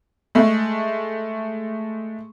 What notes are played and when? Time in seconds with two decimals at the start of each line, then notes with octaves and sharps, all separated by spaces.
0.35 G#3 A3